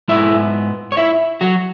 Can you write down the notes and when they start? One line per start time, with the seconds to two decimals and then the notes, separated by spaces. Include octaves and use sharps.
0.08 G#2 G#3 B3 E4 E5
0.92 C#5
0.97 E4 E5
1.41 F#3 F#4